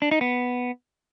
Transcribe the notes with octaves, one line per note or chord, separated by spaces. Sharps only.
D4
D#4
B3